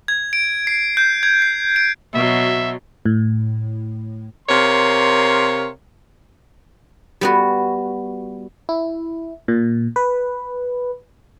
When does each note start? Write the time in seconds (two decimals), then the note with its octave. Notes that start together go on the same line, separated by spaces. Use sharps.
0.08 G#6
0.33 D7
0.67 C7
0.97 G6
1.23 G#6
1.42 C7
1.76 D7
2.14 B2 F#3 E5
3.06 A2
4.48 C3 A#4 C#5 F5 C6
7.21 G3 B3 F#4
8.69 E4
9.48 A#2
9.96 B4